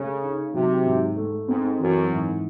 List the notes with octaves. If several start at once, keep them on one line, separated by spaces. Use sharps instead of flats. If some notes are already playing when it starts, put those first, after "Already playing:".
Already playing: C#3 A3
D#4
C3 F#3
G#2
A3
G#2 C4
F#2 E3
G#2